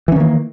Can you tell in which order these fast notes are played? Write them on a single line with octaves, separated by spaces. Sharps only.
E3 C#4 D#3 A#3